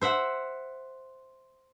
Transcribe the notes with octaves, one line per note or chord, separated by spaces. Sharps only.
C5 E5 F#5